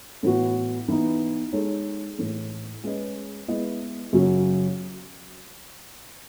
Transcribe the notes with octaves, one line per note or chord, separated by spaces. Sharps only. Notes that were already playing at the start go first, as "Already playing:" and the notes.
A2 E3 B3 F#4
E3 B3 D#4
G#3 D#4 A4 C#5
A2 E3 A3
G#3 C#4 G#4 B4 D#5
G#3 B3 E4 B4 D#5
F#2 C#3 F#3 C#4 F#4